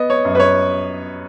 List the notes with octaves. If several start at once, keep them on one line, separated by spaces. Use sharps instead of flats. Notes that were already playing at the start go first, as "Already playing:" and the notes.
Already playing: B3 D#5
C#5
F#2
B4
C#5